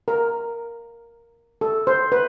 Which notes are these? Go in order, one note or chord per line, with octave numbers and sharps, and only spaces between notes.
A#4
A4
C5
B4